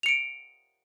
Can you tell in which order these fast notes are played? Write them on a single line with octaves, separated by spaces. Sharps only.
F7 C#7 D7